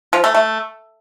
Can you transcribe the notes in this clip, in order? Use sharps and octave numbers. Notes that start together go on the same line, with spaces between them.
F3
A3
A3